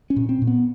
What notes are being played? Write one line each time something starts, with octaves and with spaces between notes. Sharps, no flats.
C#4
A#2
C4
A#2
B3